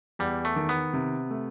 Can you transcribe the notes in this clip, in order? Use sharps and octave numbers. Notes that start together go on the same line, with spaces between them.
E2 G3
A3
D#3
B3
C3
A3